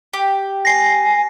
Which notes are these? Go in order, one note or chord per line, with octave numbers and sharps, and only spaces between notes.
G4
G#5 A#6 C7